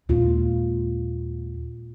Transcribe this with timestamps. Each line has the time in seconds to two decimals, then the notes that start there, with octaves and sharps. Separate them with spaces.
0.09 D#2 A#2 G#3 F4